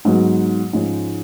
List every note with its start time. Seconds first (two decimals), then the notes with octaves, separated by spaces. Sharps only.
0.05 G#2 F#3 B3
0.73 G#2 F3 G#3 C#4